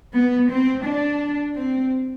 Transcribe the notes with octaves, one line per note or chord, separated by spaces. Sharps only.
B3
C4
D4
C4